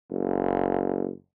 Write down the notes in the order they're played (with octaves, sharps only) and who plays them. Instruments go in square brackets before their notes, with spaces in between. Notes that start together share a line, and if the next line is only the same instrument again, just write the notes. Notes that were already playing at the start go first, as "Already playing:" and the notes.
[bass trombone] F#1